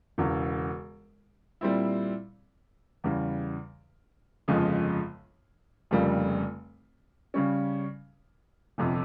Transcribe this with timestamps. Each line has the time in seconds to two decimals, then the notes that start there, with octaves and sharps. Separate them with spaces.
0.18 E1 E2 C#3
1.61 A#2 G3 C4 E4
3.04 E2 C#3 G3
4.48 G1 F2 C#3 F3 G#3
5.91 F1 F2 C#3 G3 A#3
7.34 C#3 G3 C#4
8.78 G1 F2 C3